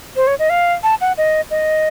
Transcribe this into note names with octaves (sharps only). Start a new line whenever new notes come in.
C5
C#5
D#5
F5
A5
F#5
D#5
D#5